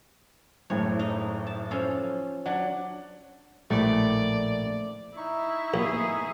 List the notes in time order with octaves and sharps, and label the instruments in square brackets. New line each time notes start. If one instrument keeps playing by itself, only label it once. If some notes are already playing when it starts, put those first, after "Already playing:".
[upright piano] F#1 A2 A3 [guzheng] C#5
[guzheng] D#4
A5
F3 C#4 A4
[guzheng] F#3 [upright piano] D4 D5 F#5
[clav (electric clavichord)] A#1 A2 [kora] A3 [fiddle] D5
[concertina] D#4 C#6 [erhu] E4
[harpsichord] A#1 [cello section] A2 B3 G#4